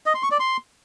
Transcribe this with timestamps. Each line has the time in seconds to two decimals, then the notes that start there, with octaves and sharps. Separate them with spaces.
0.06 D#5
0.14 C6
0.23 C#6
0.31 D5
0.40 C6